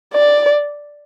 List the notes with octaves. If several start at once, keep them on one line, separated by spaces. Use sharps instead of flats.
D5